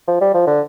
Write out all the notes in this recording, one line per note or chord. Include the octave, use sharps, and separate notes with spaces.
F3
G3
F3
D3